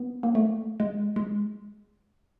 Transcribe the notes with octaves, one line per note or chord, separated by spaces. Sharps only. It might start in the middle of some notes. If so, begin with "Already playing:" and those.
Already playing: B3
A#3
A3
G#3
G#3